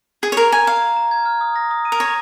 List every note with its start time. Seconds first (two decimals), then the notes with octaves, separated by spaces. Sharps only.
0.23 G#4 G#6
0.32 C#5
0.37 A#4 A#5
0.52 G#5 A#5
0.67 F5 A#5
0.82 A#5
0.97 A#5
1.11 G#6
1.26 F6
1.41 D#6
1.56 A#6
1.71 D#6
1.85 D#7
1.92 A#4
2.00 C#5 A#6